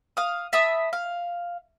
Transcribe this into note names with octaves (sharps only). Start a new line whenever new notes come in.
F5 D#6
E5 A5 B5 D#6
F5